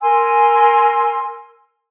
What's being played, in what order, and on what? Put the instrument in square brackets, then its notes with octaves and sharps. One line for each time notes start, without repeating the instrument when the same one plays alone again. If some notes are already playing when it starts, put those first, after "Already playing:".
[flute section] A#4 G#5 C6 E6